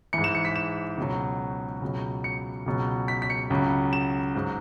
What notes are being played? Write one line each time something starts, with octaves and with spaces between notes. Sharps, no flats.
G#2 E3 C#7
E7
C#7
B6
E7
C#2 B2 F#3
C#2 B2 F#3
C#7
C#2 B2 F#3
B6
B6
C#7
C#2 C#3 F#3
E7
G#2 F#3